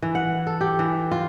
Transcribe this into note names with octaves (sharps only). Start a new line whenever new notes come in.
E3
F#5
A4
G4
E3
F4